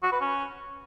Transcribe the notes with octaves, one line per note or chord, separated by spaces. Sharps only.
F#4
B4
C#4